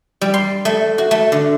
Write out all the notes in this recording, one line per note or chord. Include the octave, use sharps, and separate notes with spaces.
G3
C6
A3
F#4
A3
D3